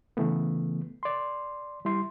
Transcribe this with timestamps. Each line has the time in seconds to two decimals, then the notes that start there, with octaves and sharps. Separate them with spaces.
0.17 C#3 E3 A3 B3
1.03 D5 C6
1.85 G3 E4 C6